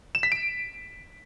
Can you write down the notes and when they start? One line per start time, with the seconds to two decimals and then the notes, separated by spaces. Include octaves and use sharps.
0.15 E7
0.23 B6
0.32 D7